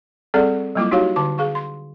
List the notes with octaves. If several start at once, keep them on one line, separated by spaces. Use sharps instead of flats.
G3 C4 G#4 A4 D5 F#5
F#3 G3 A#3 E4 F4 D6
D#4 E4 F#4 G4 C#5 F5
D3 A5 D6
G#4 F5 C#6
C6